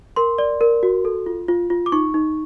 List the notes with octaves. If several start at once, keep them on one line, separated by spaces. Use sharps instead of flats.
A#4 C6
D5
A#4
F#4
A4
F4
F4
F4
D6
D#4 C#6
D#4